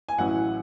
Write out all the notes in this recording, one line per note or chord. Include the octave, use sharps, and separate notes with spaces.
G#5
A1 A2 F#3 C#4 E4 F#5